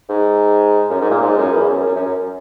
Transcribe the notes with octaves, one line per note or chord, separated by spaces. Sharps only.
G#2
F#2
G#2
A#2
G#2
F#2
E2
F#2
F#2
F#2
F#2